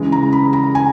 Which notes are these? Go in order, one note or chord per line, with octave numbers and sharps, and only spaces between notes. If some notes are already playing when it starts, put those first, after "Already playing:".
Already playing: C#3 E3 G#3
A#5
B5
A#5
G#5